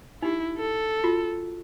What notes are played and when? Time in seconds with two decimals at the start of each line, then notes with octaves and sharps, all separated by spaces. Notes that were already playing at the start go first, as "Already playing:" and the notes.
0.22 D#4 E4 G4
0.58 A4
1.04 F4 F#4